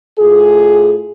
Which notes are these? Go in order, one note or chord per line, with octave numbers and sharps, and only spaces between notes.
A2 F4 G#4